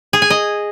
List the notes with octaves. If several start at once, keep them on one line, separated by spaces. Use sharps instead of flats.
G#4
G#5
D#5